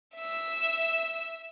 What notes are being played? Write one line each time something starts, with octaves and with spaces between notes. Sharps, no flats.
E5 E6